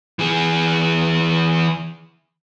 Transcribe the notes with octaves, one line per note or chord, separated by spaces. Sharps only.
E3 G#4